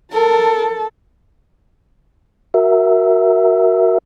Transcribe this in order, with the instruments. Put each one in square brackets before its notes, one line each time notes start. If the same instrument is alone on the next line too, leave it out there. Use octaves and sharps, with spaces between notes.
[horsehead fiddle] A4 A5 [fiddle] A#4
[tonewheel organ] F#4 A#4 E5